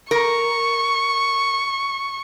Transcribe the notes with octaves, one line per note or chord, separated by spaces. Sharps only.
A#4 C#6